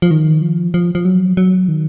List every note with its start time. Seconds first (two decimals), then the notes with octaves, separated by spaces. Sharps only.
0.02 F3
0.11 D#3
0.42 F3
0.74 F3
0.95 F3
1.05 F#3
1.37 F#3
1.68 D#3